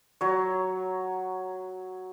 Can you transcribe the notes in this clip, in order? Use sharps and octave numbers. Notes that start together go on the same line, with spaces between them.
F#3 C#5